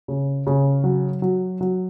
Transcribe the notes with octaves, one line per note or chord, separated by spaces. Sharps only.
C#3
C#3
F#3
F#3
F#3